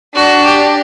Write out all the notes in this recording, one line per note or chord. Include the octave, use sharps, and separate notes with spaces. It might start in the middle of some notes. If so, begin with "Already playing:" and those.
D4 F#4
G4